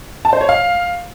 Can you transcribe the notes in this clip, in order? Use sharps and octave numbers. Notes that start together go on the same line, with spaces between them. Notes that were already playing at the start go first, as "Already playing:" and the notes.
A5
C5
C#5
F5